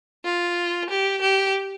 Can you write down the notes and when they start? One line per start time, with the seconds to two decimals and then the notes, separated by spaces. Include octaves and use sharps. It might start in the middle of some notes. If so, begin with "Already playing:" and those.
0.25 F4
0.90 G4
1.21 G4